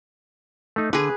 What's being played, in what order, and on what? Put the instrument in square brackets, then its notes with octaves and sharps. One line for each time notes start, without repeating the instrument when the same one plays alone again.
[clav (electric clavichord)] A3 D#4
[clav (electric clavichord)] D3 [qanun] G#4 B4